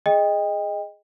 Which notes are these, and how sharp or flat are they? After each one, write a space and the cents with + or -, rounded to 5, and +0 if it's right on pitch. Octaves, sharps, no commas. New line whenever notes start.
G#4 +0 D#5 +0 G5 +30